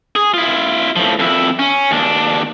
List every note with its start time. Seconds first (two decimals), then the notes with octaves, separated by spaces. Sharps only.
0.16 G#4
0.34 E4 F4
0.96 A2 F3
1.19 F2 E4
1.59 C#4
1.91 D#2 D4